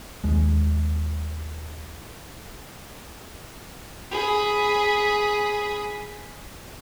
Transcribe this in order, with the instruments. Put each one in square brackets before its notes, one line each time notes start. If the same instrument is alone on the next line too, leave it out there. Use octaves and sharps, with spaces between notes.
[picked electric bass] D#2 G#3
[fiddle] G#4 B5